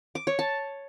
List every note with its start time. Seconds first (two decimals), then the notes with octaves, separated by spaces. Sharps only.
0.15 D6
0.27 C#5
0.39 A5